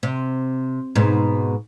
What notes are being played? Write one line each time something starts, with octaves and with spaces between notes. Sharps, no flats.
C3
G#2 B2